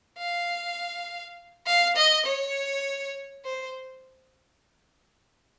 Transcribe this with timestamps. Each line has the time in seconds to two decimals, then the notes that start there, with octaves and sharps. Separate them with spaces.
0.18 F5
1.66 F5
1.96 D#5
2.26 C#5
3.44 C5